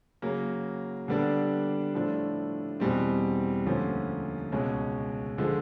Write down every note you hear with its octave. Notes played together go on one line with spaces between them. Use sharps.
C#3 F#3 A#3
D3 G3 B3 D4
A2 F3 A3 D4
E2 B2 G3 C4
D2 D3 F3 A#3 C#4
C#2 B2 G#3 C#4
D3 F3 G#3